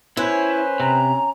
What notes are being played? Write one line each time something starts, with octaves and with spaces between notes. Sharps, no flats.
C#4 E4 B4 C5
C3 A#5